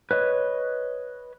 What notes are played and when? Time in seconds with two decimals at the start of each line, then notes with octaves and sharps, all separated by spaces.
0.11 B4 C#5 D#5